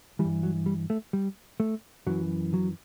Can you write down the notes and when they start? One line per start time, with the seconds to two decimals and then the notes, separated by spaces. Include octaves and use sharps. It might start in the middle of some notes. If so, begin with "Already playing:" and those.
0.19 E3 G3
0.24 G2
0.43 F#3
0.66 G3
0.90 A3
1.13 G3
1.60 A3
2.07 F#2 E3 F#3
2.54 F#3